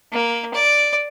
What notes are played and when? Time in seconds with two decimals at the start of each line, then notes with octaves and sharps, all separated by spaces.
0.12 A#3
0.54 D5